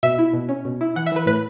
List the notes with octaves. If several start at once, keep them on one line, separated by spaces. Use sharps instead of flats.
B2 E5
E4
B2
C#4
B2
E4
E3 F#5
E5
E3 B4
A2 B4